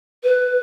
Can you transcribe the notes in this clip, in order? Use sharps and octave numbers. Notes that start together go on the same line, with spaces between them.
B4